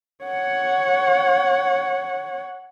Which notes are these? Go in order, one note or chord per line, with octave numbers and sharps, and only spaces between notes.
C#5 F#5